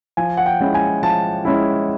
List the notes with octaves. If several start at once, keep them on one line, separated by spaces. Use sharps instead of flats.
F3 G#5
F#5
G5
G#3 C#4 E4
G#5
F3 A5
G#3 C#4 E4